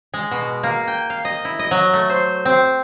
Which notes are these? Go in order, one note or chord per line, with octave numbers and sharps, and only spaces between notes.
G#3
B2
A#3
G5
F5
D#5
E4
D#5
F#3
A3
C5
C4